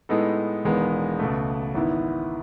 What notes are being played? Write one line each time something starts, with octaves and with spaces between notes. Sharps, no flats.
A2 G#3 B3 D#4 A4
E1 E2 D#3 G#3 B3
C#2 B2 A3
G#1 G#2 E3 B3 E4